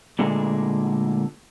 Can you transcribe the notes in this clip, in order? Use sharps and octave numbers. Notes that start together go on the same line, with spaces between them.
A#2 D3 G#3 A3